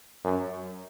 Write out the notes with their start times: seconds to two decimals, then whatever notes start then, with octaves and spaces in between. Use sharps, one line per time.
0.24 F#2